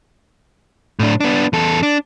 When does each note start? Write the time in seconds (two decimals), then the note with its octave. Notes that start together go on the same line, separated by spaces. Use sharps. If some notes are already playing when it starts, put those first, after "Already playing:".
0.99 A2 D4
1.20 B3 D4
1.53 E2 A4
1.83 D4